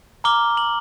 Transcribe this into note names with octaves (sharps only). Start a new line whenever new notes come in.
A#5 D6 F6 G7
F#7